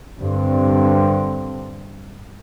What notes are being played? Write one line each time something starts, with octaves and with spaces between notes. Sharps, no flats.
G2 D3 C4